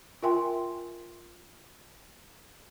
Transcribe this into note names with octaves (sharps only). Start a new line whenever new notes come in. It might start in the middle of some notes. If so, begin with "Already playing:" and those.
F4 A#4 E5 G5 G#5 C6